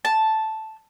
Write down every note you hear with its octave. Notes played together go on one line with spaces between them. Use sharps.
A5